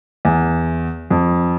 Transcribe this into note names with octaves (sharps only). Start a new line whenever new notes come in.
E2
F2